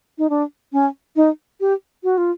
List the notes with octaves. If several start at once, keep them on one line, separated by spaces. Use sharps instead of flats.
D#4
D4
C#4
D#4
G4
F#4
F4